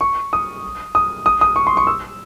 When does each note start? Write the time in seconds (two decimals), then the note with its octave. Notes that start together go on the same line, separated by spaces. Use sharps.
0.01 C#6
0.33 D#6
0.95 D#6
1.26 D#6
1.41 D#6
1.56 C#6
1.67 C6
1.77 C#6
1.87 E6